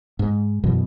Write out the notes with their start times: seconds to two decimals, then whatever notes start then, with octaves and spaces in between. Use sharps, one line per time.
0.19 G#2
0.64 F#2 B2 E3